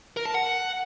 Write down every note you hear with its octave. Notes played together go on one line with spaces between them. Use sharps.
A#4
A5
F#5